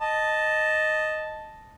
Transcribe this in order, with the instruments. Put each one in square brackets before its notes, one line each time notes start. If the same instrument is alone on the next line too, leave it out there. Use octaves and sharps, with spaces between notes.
[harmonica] D#5 A5